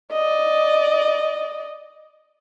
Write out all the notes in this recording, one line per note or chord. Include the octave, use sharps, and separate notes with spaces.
D5 D#5